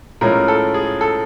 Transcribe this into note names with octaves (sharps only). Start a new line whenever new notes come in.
A2 F3 G#3 C#4 A#4
A4
G#4
A4